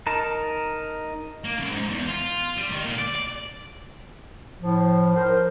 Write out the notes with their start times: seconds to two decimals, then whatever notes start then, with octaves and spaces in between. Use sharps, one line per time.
0.07 D#4 A#4 A5
1.45 A#3
1.60 F#2
1.72 G#2
1.90 E2
2.07 F4
2.57 G3
2.72 D#3
2.86 A#2
2.98 D5
3.16 D5
4.62 A2 F3
5.16 A#4 C5